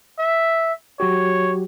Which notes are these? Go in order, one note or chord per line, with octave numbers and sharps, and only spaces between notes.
E5
F#3 F#4 G4 C#5